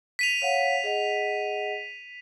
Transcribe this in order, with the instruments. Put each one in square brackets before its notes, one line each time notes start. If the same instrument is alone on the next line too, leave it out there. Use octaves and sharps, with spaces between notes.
[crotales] B6 D#7 F7
[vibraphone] C#5 F5 F#5
G#4 D#5 F#5